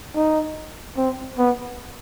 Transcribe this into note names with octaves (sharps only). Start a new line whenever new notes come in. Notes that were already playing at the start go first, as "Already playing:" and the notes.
D#4
C4
B3